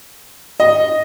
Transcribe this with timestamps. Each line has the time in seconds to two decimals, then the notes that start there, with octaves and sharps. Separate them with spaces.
0.60 D#5